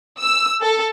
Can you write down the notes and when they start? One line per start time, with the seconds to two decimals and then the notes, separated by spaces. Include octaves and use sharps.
0.20 E6
0.61 A4